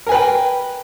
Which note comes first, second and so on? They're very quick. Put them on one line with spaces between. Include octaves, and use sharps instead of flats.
A#4 G#5 B4 G5